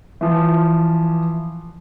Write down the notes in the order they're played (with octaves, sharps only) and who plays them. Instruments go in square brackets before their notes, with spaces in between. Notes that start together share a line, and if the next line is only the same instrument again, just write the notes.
[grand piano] E3 F3